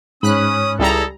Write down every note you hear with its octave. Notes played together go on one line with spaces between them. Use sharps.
G#2 C#4 B5 D#6 F#6
C#2 G3 E4 G#4 A4 A#5